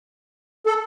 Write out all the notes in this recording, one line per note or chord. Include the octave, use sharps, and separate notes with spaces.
A4